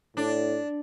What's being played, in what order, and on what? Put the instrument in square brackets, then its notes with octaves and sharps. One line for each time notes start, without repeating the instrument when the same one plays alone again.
[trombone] A2 [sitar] D4